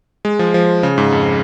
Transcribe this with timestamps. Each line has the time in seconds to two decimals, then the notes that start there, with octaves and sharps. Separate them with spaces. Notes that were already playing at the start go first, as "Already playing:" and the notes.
0.25 G#3
0.39 F3
0.54 F3
0.83 C#3
0.98 G#2
1.12 F2